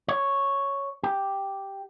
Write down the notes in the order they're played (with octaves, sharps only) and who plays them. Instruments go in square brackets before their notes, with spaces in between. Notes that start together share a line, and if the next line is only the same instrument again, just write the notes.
[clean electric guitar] C#5
G4